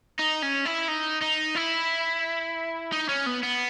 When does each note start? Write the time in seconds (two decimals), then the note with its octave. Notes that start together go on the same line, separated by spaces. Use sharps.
0.19 D#4
0.43 C#4
0.65 E4
0.88 D#4
1.22 D#4
1.56 E4
2.92 D#4
3.09 C#4
3.27 B3
3.43 B3